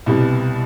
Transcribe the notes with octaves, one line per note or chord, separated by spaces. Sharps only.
C2 B2 G3